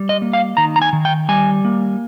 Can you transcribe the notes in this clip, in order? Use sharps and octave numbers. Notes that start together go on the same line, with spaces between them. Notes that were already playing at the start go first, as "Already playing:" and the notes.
Already playing: G3
D#5
A#3
F5
D#3 A#5
A#5
G#5
D#3
G5
G3 G#5
A#3